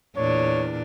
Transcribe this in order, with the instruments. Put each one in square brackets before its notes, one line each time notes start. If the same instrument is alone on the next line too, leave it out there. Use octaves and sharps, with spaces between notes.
[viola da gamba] E2 A#2 D4 [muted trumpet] C#5